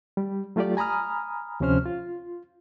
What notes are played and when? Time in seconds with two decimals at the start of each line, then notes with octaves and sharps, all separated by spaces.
0.17 G3
0.56 F#3 A3 F4 G4 D5
0.77 G#5 A#5 B5 D#6 F6
1.60 D2 C3 F3 C#4 C5 F6
1.86 F4